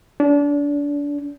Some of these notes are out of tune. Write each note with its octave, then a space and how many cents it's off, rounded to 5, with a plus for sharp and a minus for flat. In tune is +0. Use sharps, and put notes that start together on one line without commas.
D4 -30